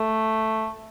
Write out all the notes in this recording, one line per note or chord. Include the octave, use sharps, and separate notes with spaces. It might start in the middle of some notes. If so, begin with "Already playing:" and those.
Already playing: A3